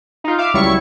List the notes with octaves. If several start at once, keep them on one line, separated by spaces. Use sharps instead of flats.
D#4 F4
E5 F5 D6
C#2 F#3 G3 E4 C#6